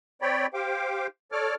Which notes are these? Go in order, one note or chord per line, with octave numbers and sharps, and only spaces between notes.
C4 C#5 D5 G5 B5
G4 C5 F5 G5 D6
A4 C#5 D5 D6 F6